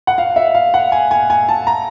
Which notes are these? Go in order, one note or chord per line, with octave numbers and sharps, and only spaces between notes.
F#5
F5
E5
F5
F#5
G#5
G#5
G#5
A5
A#5